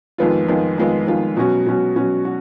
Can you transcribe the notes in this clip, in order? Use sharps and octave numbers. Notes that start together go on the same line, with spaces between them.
F2 D#3 G#3 B3 F4
F2 D#3 G#3 B3 F4
F2 D#3 G#3 B3 F4
F2 D#3 G#3 B3 F4
B2 F#3 C#4 F#4
B2 F#3 C#4 F#4
B2 F#3 C#4 F#4
F#4